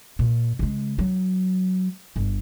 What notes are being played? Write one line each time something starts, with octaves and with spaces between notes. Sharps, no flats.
A#2
C#3 G#3
F#3
G1